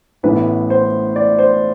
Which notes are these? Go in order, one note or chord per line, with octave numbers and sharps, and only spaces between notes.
A1 A2 E3 B3 E4 B4
C5
D5
C5